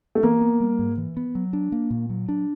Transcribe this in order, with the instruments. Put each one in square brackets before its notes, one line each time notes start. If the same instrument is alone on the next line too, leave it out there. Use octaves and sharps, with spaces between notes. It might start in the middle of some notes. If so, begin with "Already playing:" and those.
[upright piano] A3
[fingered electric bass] E3 [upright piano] A#3
[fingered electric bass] B3
G3
G#2
E3
B3
F#3
D4
A#3
A#2
F#3
D4